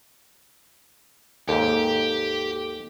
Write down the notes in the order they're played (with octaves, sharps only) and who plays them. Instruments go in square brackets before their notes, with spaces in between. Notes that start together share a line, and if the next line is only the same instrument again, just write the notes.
[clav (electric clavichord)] D#2 G#2 [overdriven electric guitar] G4 [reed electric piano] A4